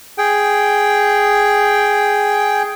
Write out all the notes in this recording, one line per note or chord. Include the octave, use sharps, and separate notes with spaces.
G#4 G5